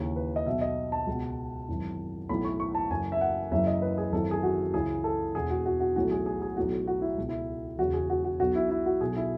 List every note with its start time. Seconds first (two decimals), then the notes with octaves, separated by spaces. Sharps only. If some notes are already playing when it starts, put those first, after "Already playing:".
Already playing: D#2 C#3 E3
0.16 B4
0.36 D#5
0.46 B1 B2 E5
0.61 D#5
0.92 A5
1.07 C#2 B2
1.68 G#1 F#2 E3
2.29 B1 A2 E3 B5
2.45 C#6
2.60 C#6
2.75 A5
2.90 F#1 F#2 E3 G#5
3.12 E5
3.21 F#5
3.51 F#1 F#2 C#3 E3 E5
3.67 D#5
3.82 B4
3.98 G#4
4.12 G#1 F#2 E3 A4
4.31 G#4
4.43 F#4
4.74 C#2 C#3 E3 G#4
5.04 A4
5.35 E1 E2 B2 G#4
5.50 F#4
5.66 F#4
5.80 F#4
5.96 B1 A2 E3 F#4
6.11 G#4
6.26 G#4
6.42 G#4
6.56 B1 A2 E3 F#4
6.87 F#4
7.01 E4
7.18 C#2 B2
7.29 E4
7.78 E1 E2 C#3 F#4
7.93 G#4
8.10 F#4
8.24 F#4
8.40 B1 B2 F#4
8.55 E4
8.70 E4
8.86 F#4
9.01 B1 B2 G#4
9.16 E4